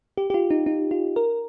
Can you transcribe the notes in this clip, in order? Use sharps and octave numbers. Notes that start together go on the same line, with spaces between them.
G4
G4
F4
D#4
D#4
F4
A#4